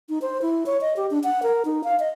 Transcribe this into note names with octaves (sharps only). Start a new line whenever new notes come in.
D#4
C5
E4
C#5
D#5
G4
D4
F#5
A#4
D#4
F5
D#5